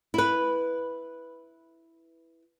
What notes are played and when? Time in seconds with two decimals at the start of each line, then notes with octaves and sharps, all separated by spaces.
0.14 E4 B4